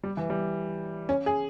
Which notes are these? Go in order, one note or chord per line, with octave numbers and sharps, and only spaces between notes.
G3
E3
G3
C#4
G#4